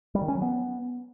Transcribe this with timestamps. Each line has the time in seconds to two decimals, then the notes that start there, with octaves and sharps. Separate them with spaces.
0.15 G3
0.22 D#3
0.28 C#4
0.35 F#3
0.42 B3